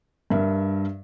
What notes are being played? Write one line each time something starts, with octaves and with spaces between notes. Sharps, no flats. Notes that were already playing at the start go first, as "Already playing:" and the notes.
G2 A#4 E5